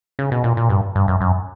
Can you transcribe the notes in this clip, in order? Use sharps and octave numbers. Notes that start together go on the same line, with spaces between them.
C#3
B2
A#2
A#2
G2
G2
F#2
F#2